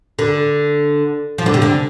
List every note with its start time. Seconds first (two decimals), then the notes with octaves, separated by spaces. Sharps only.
0.19 D3
1.38 F3
1.46 D3
1.54 C3
1.62 D3